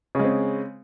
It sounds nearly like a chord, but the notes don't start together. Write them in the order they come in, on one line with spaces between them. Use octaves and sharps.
C#3 G#3 C4